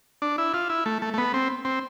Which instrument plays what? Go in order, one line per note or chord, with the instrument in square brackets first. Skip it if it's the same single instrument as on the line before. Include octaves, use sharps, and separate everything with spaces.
[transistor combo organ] D4
E4
F4
E4
A3
A3
A3
B3
C4
C4